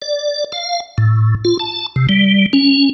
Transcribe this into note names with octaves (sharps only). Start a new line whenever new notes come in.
D5
F5
A2
F4
A5
C3
G3
C#4